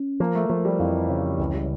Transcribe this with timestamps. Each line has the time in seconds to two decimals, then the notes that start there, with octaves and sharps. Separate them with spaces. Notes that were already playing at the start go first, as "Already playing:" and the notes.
Already playing: C#4
0.20 F3 A#3
0.35 A3
0.49 F3 A3
0.65 G3
0.79 F2 E3
1.09 C#3
1.39 C#2 E3
1.54 G3